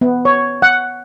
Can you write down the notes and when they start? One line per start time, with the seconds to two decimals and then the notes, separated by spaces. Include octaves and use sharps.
0.01 B3
0.25 C#5
0.62 F#5